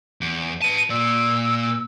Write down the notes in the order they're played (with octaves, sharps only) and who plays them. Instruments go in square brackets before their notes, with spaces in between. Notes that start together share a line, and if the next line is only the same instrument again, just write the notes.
[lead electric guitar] E2
[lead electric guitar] B4 A5 [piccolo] D#7
[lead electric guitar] A#2 D5 [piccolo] E6